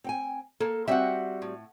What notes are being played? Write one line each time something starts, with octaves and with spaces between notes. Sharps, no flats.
C4 G5 G#5
A#3 A4
G3 C4 F#4 E5 F#5
A2